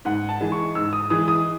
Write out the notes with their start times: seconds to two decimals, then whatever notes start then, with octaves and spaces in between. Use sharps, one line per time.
0.05 G#2 F#5
0.29 A5
0.41 E3 G#3
0.52 C#6
0.75 G#2 E6
0.93 D#6
1.10 E3 G#3 D#6
1.28 D#6